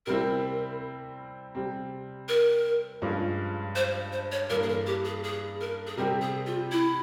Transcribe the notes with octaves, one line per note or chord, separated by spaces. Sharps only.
C3 G3 C4 E4 A#4
C3 G3 C4
A#4
G2 F3 G#3 C#4 F4
C5
C5
C#5
G2 E3 A#3 A#4
G#4
A#4
G4
G#4
G#4
A#4
G#4
C3 G3 C4 G4 A#4
G#4
F4
E4